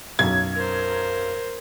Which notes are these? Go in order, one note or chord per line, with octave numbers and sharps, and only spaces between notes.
B1 F#2 G#6
A#4 C5